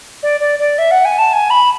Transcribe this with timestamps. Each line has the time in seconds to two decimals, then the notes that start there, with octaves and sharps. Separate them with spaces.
0.23 D5
0.40 D5
0.59 D5
0.78 E5
0.91 F#5
1.05 G#5
1.18 A5
1.33 G#5
1.50 B5